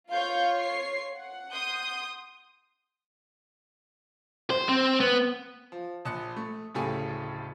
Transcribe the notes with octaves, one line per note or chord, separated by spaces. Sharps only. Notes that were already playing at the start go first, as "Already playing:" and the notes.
F4 C#5 F5 G6
C7
F#5
C6 D#6 G6
C5
C4
B3
F3
A#1 A5 D#6 F#6 C#7
A3
D1 A2 C#3 G4 A4 G#5